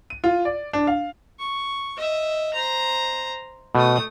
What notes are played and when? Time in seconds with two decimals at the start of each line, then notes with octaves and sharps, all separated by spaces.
0.10 D#7
0.24 F4
0.45 D5
0.73 D4
0.87 F5
1.39 C#6
1.97 D#5 E5
2.54 C5 A#5
3.75 B2 A3 D#6